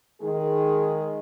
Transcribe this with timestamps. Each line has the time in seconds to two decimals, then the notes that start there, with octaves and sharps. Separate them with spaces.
0.22 D#3 G#3 G#4